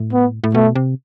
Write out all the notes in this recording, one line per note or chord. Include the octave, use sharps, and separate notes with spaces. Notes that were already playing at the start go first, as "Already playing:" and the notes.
Already playing: A2
B3
A2
B2 A3
C3